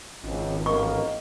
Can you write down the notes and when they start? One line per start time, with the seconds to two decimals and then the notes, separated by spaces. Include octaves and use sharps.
0.23 G#1 C#2
0.66 A1 A#3 D#5 C#6